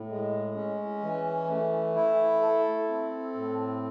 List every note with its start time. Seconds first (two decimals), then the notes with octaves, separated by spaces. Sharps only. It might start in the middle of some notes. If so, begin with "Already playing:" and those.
Already playing: A2
0.09 G#3
0.55 C#4
1.02 E3
1.48 A3
1.95 E4
2.42 A4
2.88 C4
3.34 A2